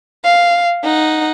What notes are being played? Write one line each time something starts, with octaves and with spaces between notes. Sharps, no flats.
F5
D#4 F#5